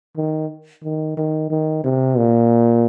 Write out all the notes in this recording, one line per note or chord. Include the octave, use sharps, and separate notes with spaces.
D#3
D#3
D#3
D#3
C3
A#2